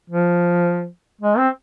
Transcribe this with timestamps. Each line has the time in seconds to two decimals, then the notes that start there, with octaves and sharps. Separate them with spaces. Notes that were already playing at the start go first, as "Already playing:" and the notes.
0.10 F3
1.21 G#3
1.38 C4